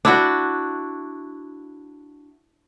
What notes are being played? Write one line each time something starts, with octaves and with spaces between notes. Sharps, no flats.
D4 E4 F#4